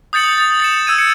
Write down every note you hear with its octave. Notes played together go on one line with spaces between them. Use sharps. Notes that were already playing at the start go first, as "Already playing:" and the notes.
D#6 G6 A6 C#7 F#7
D#6 A6
A6 C#7 E7
E6 G#6 D#7
C#7